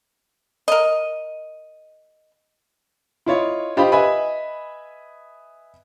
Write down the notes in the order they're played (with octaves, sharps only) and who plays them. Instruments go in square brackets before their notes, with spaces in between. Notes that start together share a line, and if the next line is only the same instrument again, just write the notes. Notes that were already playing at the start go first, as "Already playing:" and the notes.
[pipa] A#4 D#5
[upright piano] E4 F4 C#5 D#5
F4 G4 C5 D#5 F5 B5
B4 D#5 E5 G#5 B5